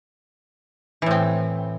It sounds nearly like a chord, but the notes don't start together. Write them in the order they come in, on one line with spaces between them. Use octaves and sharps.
E3 A2 C4